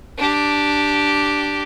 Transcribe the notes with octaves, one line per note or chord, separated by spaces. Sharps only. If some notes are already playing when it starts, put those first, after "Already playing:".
D4 G4